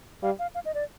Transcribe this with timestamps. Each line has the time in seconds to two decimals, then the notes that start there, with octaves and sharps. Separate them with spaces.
0.23 G3 F5
0.39 F5
0.55 F5
0.65 D#5
0.74 D5